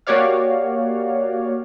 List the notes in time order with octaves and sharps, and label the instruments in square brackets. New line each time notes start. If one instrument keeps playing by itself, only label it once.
[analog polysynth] A#3 F#4 G4 C#5 D5 F5